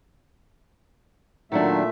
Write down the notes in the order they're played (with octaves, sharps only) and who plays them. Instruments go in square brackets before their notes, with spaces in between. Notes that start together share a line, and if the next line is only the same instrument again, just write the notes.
[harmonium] A#2 A3 E5 [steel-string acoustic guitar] D#3 F#3 D4